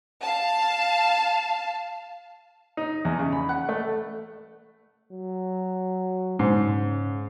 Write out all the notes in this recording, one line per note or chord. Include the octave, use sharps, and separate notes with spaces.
F5 A5
D#4
E2
C#3
B5
F#5
A3
F#3
G#2 C#3